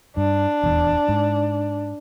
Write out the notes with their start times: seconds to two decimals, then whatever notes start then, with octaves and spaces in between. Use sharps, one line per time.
0.17 G2 D4
0.63 D#1 E2
1.09 G#2